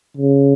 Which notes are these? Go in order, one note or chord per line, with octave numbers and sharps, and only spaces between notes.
C#3